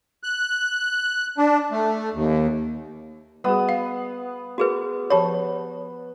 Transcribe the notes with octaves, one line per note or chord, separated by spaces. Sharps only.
F#6
D4
A3
D#2
G3 B3 F#4 G#4 D#6
F5
F#4 G#4 B4
F3 G4 C#5 A5 B5